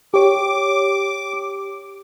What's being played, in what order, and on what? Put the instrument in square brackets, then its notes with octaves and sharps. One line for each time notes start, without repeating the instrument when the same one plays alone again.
[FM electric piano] G4 C#5 [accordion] D6